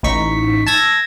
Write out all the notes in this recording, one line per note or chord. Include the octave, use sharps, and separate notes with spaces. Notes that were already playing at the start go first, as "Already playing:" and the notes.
A1 A2 D#4 C#6 B6
A5 E6 G#6 A#6